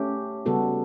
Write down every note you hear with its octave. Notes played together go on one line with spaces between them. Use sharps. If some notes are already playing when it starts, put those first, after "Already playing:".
Already playing: A3 C#4 G4
C#3 G3 B3 F#4 A4